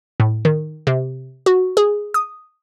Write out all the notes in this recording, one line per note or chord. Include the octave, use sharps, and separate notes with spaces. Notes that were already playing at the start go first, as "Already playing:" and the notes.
A2
D#3
C3
F#4
G#4
D#6